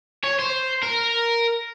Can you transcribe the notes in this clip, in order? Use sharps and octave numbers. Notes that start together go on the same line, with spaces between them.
C#5
C5
A#4